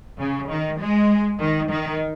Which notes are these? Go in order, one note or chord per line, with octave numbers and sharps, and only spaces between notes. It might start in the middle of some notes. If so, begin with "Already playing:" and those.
C#3
D#3
G#3
D#3
D#3